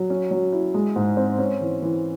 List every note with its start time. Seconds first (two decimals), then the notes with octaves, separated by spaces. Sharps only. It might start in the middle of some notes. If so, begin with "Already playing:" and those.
Already playing: F#3
0.10 C#4
0.31 F#3
0.53 E4
0.74 G#3
0.96 G#2
1.17 C4
1.38 C#4
1.61 E3
1.82 E3